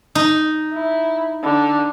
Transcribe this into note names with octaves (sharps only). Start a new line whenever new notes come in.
D#4
E4
D3